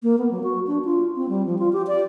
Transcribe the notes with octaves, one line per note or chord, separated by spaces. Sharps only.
A#3
B3
F#3
F#4
D4
F4
C4
G3
F3
F4
G4
D5